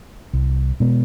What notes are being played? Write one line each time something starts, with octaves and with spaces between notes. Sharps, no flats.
C2
B2 G#3 B3